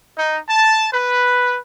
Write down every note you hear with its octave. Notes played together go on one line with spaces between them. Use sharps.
D#4
A5
B4